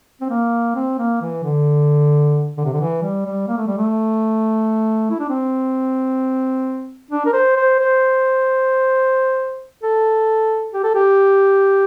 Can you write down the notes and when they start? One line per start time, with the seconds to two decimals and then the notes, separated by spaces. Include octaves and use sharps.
0.21 C4
0.30 A#3
0.75 C4
0.99 A#3
1.22 E3
1.43 D3
2.57 D3
2.65 C3
2.73 D3
2.81 E3
3.02 G3
3.26 G3
3.48 A#3
3.57 A3
3.67 G3
3.77 A3
5.11 E4
5.20 D4
5.30 C4
7.11 D4
7.26 A#4
7.33 C5
7.57 C5
7.80 C5
9.83 A4
10.74 G4
10.84 A4
10.95 G4